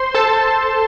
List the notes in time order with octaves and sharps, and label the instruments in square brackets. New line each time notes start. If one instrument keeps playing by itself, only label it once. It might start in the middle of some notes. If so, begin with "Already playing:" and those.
Already playing: [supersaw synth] C5 C6
A4 A5